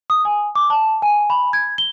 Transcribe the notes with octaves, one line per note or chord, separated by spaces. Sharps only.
D#6
G#5
D6
A5
G#5
B5
G#6
G7